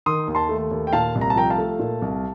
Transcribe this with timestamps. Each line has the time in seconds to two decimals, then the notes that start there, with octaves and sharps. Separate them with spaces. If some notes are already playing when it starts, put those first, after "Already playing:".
0.06 D#3 C6 D#6
0.27 D#2
0.35 A5 C6
0.49 A3
0.71 D#2
0.87 G5
0.93 A#2 F5 A5
1.15 C2
1.21 A#5
1.30 A5
1.36 F3 G5 A#5
1.50 F5 A5
1.58 A3
1.79 A#2
2.02 C2